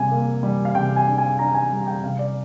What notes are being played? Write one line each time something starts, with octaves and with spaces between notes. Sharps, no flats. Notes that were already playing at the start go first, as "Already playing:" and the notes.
Already playing: C3 G3 G#5
A#3
G3
F5
C3 G5
G#5
D4
G#5
D4 A#5
G#5
G3
G5
C3 F5
D5